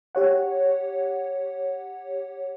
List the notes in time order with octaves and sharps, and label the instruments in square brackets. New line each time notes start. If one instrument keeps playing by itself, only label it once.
[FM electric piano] G4 C#5 F#5